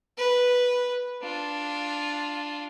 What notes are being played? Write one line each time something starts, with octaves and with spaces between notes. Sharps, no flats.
B4
D4 F4